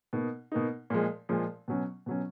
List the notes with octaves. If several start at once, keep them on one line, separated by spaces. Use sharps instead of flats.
B2 A#3 D#4
B2 A#3 D#4
A#2 F3 G#3
A#2 F3 G#3
B2 F#3 C#4
B2 F#3 C#4